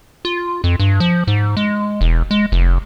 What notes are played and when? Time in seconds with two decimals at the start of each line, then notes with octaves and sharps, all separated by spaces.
0.25 F4
0.64 F2
0.80 G2
1.00 F3
1.27 G#2
1.57 G#3
2.01 E1
2.31 G#3
2.52 F1